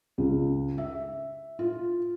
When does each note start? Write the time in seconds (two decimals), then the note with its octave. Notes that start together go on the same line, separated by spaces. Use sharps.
0.18 C#2
0.78 E5
1.59 F4